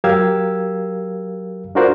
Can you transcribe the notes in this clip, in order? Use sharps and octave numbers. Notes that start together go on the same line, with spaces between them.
F#3 G4 A#4 F5 E6 G#6
D4 F4 F#4 A#4 C5 D5